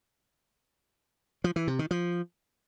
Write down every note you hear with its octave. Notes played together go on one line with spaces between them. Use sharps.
F3
E3
C3
D#3
F3